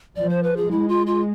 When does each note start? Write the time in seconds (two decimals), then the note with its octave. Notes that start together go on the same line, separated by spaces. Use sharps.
0.16 F3 D5
0.29 C5
0.43 B4
0.57 G#4
0.70 G#3 E4
0.88 F4
1.07 F4